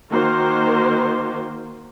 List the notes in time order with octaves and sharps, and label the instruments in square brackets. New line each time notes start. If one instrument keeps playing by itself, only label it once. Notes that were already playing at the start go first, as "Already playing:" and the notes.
[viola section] D#3 A#3 F#4 A#4 C5